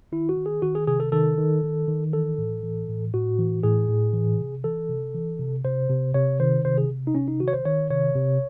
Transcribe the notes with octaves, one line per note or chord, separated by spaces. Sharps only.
D#3 E4
F#4
D#3
G#4
D#3 F#4
G#4
C3 G#4
A4
D#3 A4
D#3
D#3
D#3
E3 A4
A2
E3
A2
A2 F#4
E3
A2 G#4
A2
E3
C3
E3 A4
C3
E3
C3
C3 C5
C3
C3 C#5
D#3 C5
C3 C5
G#4
C3
D#4
C3 C#4
D#4
D#3 F#4
C#5
C5
D#3 C#5
C3 C#5
C3